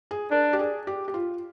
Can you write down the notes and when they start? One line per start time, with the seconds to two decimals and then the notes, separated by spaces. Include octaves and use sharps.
0.11 G#4
0.31 D4 A#4
0.53 G4
0.59 G#4
0.87 G4
1.08 G4
1.14 F4